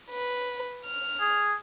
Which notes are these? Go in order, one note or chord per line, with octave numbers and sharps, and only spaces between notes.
B4
F6
G#4